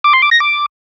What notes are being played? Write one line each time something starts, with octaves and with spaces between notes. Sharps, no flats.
D6
C6
D6
A#6
D6